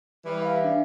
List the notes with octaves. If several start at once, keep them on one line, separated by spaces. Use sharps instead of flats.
E3 G3
E5 F5
D4